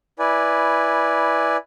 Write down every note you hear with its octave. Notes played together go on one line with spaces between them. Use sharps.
E4 B4 D5 G#5